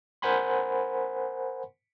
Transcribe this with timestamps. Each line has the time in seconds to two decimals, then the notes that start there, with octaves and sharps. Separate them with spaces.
0.22 A#4 C5 F#5 G#5 B5 C6